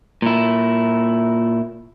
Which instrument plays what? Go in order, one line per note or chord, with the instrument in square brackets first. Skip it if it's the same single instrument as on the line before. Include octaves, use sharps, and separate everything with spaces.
[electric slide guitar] A#2 E4